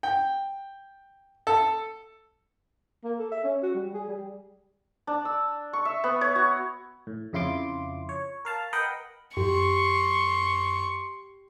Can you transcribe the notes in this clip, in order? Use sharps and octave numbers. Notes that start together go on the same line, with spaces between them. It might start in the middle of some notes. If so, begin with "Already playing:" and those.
G5
A4
A#3
A4
E5
C#4
F#4
G3
G#4
G3
D4
E6
C#6
E5
B3
C#5
F#4
A2
F2 C#3 E4 F4 C6 D6
C#5
A#4 F5 A5
A#4 B4 D#5 F#5 G5
F#2 G4 C6 C#6